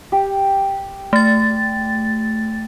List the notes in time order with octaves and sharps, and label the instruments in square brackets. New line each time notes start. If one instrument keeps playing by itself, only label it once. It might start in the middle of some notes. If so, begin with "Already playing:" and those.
[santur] G4
[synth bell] A3 A6